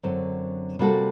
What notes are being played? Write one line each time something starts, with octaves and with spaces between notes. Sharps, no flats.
F#2 D3 F#3 C4
C3 G3 A#3 F#4 A4